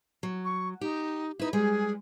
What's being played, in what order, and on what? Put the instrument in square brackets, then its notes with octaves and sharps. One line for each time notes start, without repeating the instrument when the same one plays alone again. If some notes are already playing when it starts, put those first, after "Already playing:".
[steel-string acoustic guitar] F#3
[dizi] C#6
[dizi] D#4 [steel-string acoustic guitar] G4
[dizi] D#4 [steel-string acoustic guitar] E4 B4
[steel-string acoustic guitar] G3 G#3 [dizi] G#4